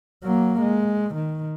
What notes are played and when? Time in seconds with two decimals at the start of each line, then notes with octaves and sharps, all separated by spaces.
0.23 F#3 A#3
0.61 G#3
1.15 D#3